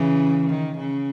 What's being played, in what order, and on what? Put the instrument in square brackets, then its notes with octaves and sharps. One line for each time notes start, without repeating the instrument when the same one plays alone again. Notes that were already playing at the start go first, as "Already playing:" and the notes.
Already playing: [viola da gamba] C#3 E3
D#3
C#3